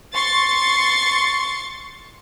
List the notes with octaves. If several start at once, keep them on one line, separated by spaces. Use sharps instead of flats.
C6 C#6 A6